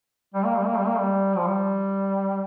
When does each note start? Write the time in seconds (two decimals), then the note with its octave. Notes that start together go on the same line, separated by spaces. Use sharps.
0.34 G3
0.45 A#3
0.56 G3
0.66 A#3
0.77 G3
0.87 A#3
0.99 G3
1.37 F3
1.47 G3